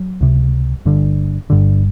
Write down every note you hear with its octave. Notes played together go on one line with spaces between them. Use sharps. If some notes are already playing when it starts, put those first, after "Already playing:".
Already playing: F#3
C#2 C3
G1 G2 D3
G1 G2 D3